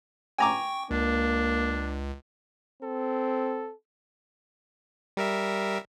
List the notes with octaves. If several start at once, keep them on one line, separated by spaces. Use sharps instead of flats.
G5 G#5 A#5 C#6 D6
C#2 A#3 D4
C4 A4
G3 A#4 E5